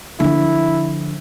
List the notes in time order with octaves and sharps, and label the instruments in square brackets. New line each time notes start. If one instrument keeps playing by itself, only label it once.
[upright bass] D3 F3 [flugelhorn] E4